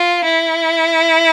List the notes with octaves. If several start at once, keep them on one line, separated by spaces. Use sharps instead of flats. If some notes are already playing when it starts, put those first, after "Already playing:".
Already playing: F4
E4